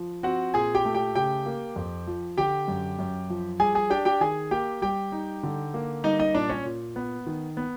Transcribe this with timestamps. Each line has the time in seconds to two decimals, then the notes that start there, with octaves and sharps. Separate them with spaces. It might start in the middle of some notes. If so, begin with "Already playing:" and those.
Already playing: F3
0.23 C4 F#4 F#5
0.54 A#2 G#4 G#5
0.75 G4 G5
0.85 A3
0.95 G4 G5
1.15 C#3 G4 G5
1.46 A#3
1.76 F2
2.07 F3
2.37 D3 G4 G5
2.68 F#2
2.99 F#2
3.30 F3
3.60 G3 G#4 G#5
3.75 G#4 G#5
3.90 D4 G4 G5
4.05 G4 G5
4.21 D#3 G#4 G#5
4.51 A#3 G4 G5
4.82 G3 G4 G5
5.12 D#4
5.43 D3
5.74 A#3
6.04 G3 D#4 D#5
6.19 D#4 D#5
6.34 A#2 D4 D5
6.50 C#4 C#5
6.65 A#2
6.96 B3
7.26 D#3
7.57 B3